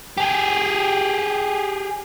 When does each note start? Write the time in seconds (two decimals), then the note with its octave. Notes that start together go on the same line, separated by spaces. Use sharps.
0.17 G4 G#4